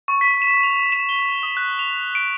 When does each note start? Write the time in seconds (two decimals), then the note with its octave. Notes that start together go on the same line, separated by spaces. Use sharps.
0.08 C#6
0.21 B6
0.42 E7
0.63 F7
0.92 E7
1.09 G7
1.43 D#6
1.57 F#6
1.79 F7
2.15 D7